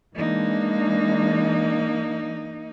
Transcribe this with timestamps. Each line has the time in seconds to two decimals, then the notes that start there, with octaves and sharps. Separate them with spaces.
0.15 E3 G#3 A#3 D4 D#4